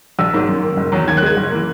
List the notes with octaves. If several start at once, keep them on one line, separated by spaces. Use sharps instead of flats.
A#1 E6
G#2 F#3 A#3
F#2
D#3 A#3
F#1
E2 D#3 F#3 A#3
D#2 G#6
F#6
D#3 G#3 G#6
F#1
E3 A#3